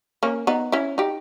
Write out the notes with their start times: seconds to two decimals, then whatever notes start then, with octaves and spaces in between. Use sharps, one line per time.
0.23 A#3 C#4
0.47 B3 D#4
0.72 C#4 E4
0.98 D#4 G4